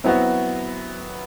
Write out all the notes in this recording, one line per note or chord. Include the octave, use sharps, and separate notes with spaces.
F#3 B3 C4 E4 F#4